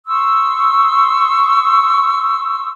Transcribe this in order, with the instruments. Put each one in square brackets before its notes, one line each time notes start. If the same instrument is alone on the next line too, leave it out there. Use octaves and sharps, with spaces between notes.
[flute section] C6 C#6 D#6 E6